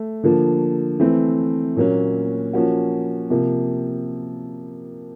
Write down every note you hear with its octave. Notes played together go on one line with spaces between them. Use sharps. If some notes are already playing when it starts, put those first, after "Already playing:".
Already playing: A3
D3 F3 A#3
E3 A3 C4
A#2 F#3 A#3 C#4
F3 A#3 C#4 F#4
C3 F3 A#3